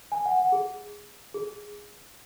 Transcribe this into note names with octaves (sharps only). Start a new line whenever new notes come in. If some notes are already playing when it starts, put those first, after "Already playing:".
G#5
F#5
F#5
G#4
G#4